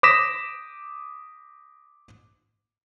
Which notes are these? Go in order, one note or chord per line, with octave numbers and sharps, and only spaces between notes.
D6 D#6 A#6 B6 E7